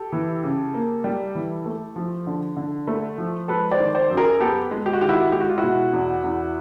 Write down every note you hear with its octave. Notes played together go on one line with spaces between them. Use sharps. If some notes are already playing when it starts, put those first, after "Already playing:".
Already playing: G4 A4
E3
C#3
A#3
G3
E3
A3
F3
D3
D3
A3
F3
G#3 A4 B4
C5 D5
D#3
C5 D5
F#2
G#4 A#4
B3 G4 A4
G#3
G4
F#4
D#3 F4 G4
E4 F#4
G#3 G4
F#4
F4
B2 E4 F#4
E2
E2